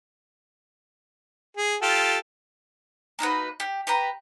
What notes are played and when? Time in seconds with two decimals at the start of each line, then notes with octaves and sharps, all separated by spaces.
1.57 G#4
1.82 F4 G4 A4
3.19 A#3 D#4 F#4 B4
3.60 G4
3.87 G4 B4 A#5